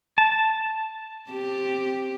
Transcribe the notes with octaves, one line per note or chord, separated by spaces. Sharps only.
A5
C4 G4